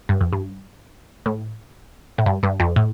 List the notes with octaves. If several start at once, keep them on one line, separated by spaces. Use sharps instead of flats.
G2
F2
G2
A2
A2
G2
G2
F2
A2